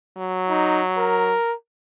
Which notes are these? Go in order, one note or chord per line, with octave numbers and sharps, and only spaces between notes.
F#3
D#4
A#4